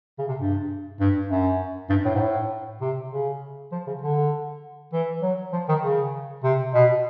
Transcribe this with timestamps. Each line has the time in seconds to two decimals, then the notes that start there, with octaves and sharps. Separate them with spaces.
0.18 C#3
0.28 C3
0.38 G2
1.00 G2
1.29 F#2
1.89 G2
2.05 A2
2.15 G#2
2.20 A2
2.81 C3
3.10 C#3
3.72 F3
3.87 C#3
4.01 D3
4.93 E3
5.22 F#3
5.53 F3
5.68 D#3
5.82 C#3
6.43 C3
6.74 B2